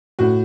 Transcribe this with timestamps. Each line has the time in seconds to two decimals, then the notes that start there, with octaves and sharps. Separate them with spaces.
0.19 A2 F#4